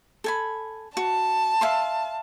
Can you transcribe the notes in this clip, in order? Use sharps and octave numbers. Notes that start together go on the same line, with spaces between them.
A4 G#5 B5
F#4 A5
E5 F5 C6